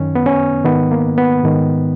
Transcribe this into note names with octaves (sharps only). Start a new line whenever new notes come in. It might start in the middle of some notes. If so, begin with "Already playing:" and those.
Already playing: F#2 D#3 C#4
B3
C#4
G#2 D#3 B3
A#3
B3
G#2 D#3